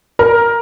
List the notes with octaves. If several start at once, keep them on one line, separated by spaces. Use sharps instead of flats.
A#4